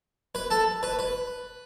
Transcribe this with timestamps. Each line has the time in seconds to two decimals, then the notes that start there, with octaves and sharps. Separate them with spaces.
0.35 B4
0.50 A4
0.83 B4
0.99 B4